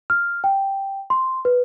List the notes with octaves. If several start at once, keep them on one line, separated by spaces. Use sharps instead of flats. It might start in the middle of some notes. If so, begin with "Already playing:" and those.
F6
G5
C6
B4